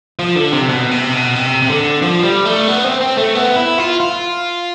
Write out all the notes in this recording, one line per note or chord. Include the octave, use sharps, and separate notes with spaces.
F3
D3
C3
B2
C3
B2
C3
C3
D3
F3
G3
A3
B3
C4
C4
A3
B3
E4
F4
F4